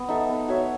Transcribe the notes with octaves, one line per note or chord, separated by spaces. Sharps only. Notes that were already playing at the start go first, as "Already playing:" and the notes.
Already playing: B3
D#4 A4 E5
B3
F#4 C#5 E5